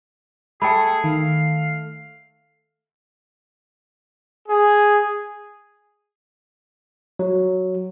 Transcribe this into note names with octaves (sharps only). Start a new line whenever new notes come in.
A3 G#4 A4 G5 B5
D#3 F5
G#4
F#3